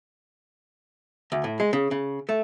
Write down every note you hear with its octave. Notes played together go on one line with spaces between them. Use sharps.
D2
A2
G#3
C#3
C#3
A3